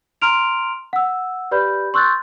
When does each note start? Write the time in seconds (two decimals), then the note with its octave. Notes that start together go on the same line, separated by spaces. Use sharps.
0.22 A#5 C6 F6 D7 F7
0.93 F#5 E6
1.51 G4 B4 D5 B5 G6
1.94 C6 C#6 E6 F#6 G6 A6